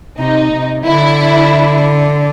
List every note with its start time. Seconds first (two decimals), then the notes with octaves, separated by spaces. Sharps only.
0.19 C3 D#4
0.53 C3
0.86 D3 E4